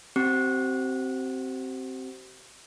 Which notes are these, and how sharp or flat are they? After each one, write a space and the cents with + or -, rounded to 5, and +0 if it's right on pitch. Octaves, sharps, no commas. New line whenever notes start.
C4 +0 G4 -40